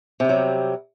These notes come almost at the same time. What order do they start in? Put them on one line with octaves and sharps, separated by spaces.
C3 G3 F#3